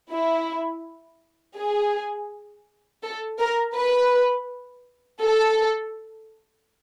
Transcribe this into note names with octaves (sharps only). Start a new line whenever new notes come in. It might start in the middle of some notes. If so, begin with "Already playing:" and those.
E4
G#4
A4
A#4
B4
A4